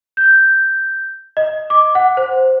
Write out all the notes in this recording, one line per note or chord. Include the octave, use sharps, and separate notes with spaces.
G6
D#5
D6
F#5
C5